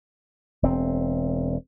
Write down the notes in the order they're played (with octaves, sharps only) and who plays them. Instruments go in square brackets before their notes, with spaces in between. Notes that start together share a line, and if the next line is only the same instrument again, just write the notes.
[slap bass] E1 C4